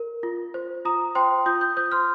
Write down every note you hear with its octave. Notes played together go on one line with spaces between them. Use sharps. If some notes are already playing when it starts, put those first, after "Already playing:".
Already playing: A#4
F4
C5
F4 A#5 D#6
C5 G5 C6
F4 D#6 G6
D#6 G6
C5 D#6 G6
C6 F6